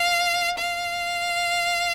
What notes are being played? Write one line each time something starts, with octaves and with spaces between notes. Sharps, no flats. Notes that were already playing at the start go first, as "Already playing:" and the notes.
Already playing: F5
F5